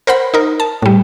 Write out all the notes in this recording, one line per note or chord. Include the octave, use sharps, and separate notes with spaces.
A#4 C5 F#5 B5
D#4 A#4
A5
A2 G3